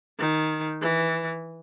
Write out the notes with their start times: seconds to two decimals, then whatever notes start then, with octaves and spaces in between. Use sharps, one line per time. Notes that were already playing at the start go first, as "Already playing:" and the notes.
0.18 D#3
0.81 E3